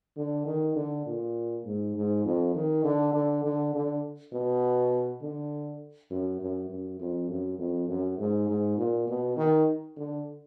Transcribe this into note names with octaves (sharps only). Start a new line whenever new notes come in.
D3
D#3
D3
A#2
G#2
G#2
F2
D#3
D3
D3
D3
D3
B2
D3
F#2
F#2
F#2
F2
F#2
F2
F#2
G#2
G#2
A#2
B2
D#3
D3